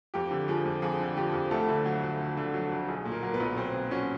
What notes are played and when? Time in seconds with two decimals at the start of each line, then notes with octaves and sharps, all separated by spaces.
0.14 F2 G4
0.31 D3
0.48 F3 G#4
0.66 F2
0.82 F2 G#4
1.00 D3
1.17 F3 G4
1.34 F2
1.51 D2 A3 A4
1.69 D3
1.86 F#3
2.03 D2
2.20 D2
2.37 D3
2.54 F#3
2.72 D2
2.88 B1 G#4
3.05 A#2
3.12 A#3 A#4
3.23 F#3 A#4
3.34 B3 B4
3.40 B1
3.57 B1 C4 C5
3.74 A#2
3.91 F#3 C#4 C#5